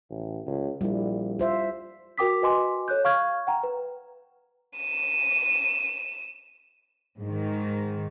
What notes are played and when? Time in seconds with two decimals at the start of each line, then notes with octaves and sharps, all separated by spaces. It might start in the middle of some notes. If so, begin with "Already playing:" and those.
0.10 A1
0.46 C#2
0.81 A#1 G3 E4
1.39 F4 C5 E5
2.18 F#4 A#4 G5 D6 D#6 B6
2.42 F#4 B4 D#5 G#5 C6 D6
2.88 A4 C#5 F#6 G6
3.04 F5 C#6 F6 G#6
3.47 F#5 G5 A#5
3.63 B4
4.77 D#7 E7
7.20 G#2 D#3